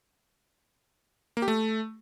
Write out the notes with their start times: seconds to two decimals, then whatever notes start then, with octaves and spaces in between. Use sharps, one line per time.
1.37 A#3
1.42 G4
1.48 A3